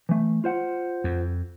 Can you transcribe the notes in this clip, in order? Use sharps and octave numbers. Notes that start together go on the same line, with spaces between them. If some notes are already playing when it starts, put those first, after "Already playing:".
E3 A3
F4 C5 F#5
F2